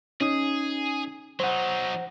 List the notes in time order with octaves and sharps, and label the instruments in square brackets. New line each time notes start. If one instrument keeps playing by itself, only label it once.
[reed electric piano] C#4 D#4 D#6 [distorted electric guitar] G#4
[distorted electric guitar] F#3 D#4 [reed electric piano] C5 F#5